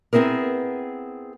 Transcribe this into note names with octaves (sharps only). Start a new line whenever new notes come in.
B3 C4 E4 G#4 A#4